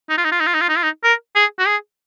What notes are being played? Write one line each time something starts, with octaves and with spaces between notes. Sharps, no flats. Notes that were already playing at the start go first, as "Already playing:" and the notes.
D#4
F4
D#4
F4
D#4
F4
D#4
F4
D#4
F4
D#4
A#4
G#4
F#4
G#4